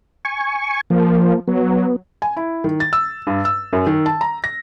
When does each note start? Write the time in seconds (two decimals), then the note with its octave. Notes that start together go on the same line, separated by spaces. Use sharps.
0.25 G#5 C#6
0.90 F3 A#3
1.48 F#3 B3
2.22 G#5
2.37 E4
2.64 D#3
2.80 A6
2.93 E6
3.27 G2
3.45 E6
3.73 F#2
3.87 D#3
4.06 A5
4.21 A#5
4.44 A#6